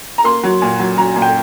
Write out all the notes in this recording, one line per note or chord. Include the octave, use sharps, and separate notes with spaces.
A#5
A#3 C6
F#3
A#2
F#3
F#3 A#5
A#2
G5